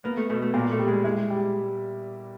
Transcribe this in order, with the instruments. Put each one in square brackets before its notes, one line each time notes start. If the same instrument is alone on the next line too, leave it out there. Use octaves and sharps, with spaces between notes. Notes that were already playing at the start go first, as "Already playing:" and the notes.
[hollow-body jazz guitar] A#3 [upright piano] B3
[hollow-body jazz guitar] A3
[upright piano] B2 [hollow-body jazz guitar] A3
[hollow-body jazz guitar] A3
[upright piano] A#2 [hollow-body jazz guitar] A#3
[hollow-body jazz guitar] A3
[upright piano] G3
[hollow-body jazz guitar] G#3
[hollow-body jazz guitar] G#3 [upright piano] E4
[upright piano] G3